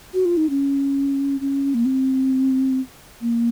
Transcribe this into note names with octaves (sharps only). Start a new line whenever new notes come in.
F#4
F4
D#4
C#4
C#4
A#3
C4
A#3